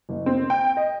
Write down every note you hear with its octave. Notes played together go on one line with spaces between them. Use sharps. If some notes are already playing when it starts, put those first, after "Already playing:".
F#1
C4
G5
D#5